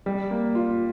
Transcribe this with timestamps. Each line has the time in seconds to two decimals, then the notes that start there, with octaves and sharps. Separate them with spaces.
0.06 G3
0.31 A#3
0.55 F4